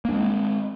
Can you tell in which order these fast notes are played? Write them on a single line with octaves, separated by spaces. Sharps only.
A#3 D4 G#3 C4